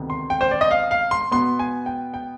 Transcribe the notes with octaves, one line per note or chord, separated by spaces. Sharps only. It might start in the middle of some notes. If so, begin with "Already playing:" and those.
Already playing: D2 C3 D#3 B3
C6
G5
C5
D5
D#5
F5
F5
C6
B2 B3 C6
G#5
G5
G5